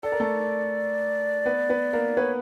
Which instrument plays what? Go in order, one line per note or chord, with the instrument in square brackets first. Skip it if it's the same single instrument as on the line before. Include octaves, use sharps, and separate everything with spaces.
[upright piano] A4 [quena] D5
[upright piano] A#4
A3 A4
B3 B4
B3 B4
A#3 A#4
[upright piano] B3 B4 [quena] C#5